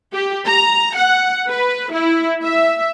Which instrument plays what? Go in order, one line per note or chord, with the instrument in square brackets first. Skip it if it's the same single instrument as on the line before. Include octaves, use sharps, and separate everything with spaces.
[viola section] G4
A#5
F#5
B4
E4
E5